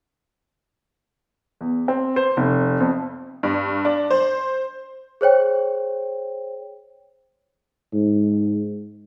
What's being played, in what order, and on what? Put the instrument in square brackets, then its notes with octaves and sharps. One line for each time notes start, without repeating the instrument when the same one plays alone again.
[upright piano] E2
C4
C5
F1
F2
[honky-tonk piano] G2
D4
C5
[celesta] G#4 C5 C#5 G5
[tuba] G#2